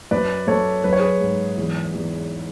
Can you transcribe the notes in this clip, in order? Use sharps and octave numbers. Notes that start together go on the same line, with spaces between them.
F#2 B4 D5
F#2 A4 C#5
F#3 B4
C#5
G#4 B4
G#2
E2
E2